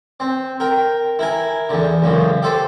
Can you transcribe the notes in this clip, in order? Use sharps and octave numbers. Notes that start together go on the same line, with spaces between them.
C4
A#4 G5
E4 A#4 G#5
E2 D3
C#2 F#2 C#3
G4 A4 C5